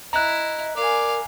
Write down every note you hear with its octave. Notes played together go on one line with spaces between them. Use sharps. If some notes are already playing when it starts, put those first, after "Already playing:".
E4 D#5 A#5 F#6
A#4 D5 F5 G#5